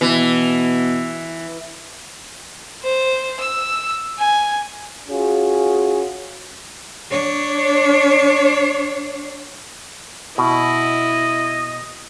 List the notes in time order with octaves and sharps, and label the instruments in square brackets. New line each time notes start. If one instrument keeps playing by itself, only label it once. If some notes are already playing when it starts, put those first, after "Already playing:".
[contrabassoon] B2 [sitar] E3
[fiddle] C5
E6
G#5
[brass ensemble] C#4 F4 F#4 G#4
[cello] D4 C#5
[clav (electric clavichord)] B2 [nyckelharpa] E4 [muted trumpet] D#5